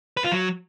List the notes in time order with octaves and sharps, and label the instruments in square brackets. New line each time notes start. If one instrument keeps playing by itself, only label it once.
[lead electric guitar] B4
F4
F#3